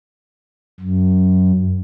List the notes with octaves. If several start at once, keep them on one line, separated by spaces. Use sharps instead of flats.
F#2